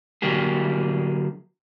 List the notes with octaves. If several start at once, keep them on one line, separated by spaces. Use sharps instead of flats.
D3 F#3 A#3 G4 G#4